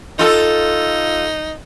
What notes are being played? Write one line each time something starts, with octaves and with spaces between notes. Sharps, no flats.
D#4 F4 A4